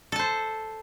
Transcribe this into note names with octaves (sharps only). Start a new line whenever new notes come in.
A4 C5 A5